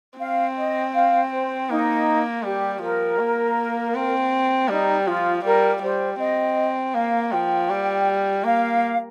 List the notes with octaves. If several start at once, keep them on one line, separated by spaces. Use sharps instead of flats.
C4 F5
D#5
F5
C5
A#3 D#4
G3 G4
F3 A#4
A#3
C4
G3 D#4
F3 F4
G3 A#4
G3 C5
C4 D#5
A#3 F5
F3 G5
G3
A#3 F5